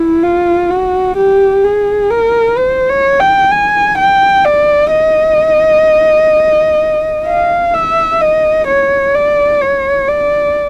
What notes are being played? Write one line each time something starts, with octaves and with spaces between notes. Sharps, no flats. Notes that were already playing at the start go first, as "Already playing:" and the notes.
Already playing: E4
F4
F#4
G4
G#4
A#4
C5
C#5
G5
G#5
G5
D5
D#5
F5
E5
D#5
C#5
D5
C#5
D5